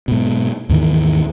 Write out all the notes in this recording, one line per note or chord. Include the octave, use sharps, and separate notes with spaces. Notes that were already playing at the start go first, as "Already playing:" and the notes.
G#2 B2
D#2 G#2 D#3 E3